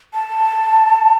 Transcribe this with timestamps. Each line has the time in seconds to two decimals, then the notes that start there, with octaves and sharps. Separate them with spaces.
0.14 A5